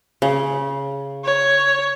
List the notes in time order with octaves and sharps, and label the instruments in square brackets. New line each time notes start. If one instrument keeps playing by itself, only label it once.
[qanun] C#3
[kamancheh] C#5